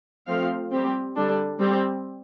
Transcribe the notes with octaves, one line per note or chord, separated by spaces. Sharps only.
F3 A3 C4 F5
G3 C4 G4
D3 G3 D4 A4
G3 C4 G4